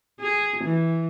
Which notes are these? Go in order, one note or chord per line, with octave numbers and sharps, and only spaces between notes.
G#4
E3